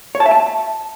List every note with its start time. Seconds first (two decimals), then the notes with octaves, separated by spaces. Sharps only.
0.15 C#5
0.20 A5
0.26 E5
0.31 A5